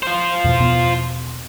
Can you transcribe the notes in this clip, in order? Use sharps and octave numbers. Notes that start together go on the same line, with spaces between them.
F4 C5
E2 B2
E2 B2 B3